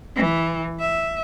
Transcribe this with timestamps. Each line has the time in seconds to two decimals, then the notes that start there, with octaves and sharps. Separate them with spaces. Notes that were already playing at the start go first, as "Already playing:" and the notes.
0.16 E3
0.80 E5